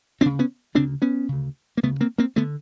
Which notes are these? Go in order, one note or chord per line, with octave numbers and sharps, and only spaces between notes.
D2 C#3 C4 D4
B3 C#4
D2 C#3 C4 D4
B3 C#4
D2 C#3
A#3
D2 C#3 A3 B3
A#3 C4
A#3 C4
D3 A3 B3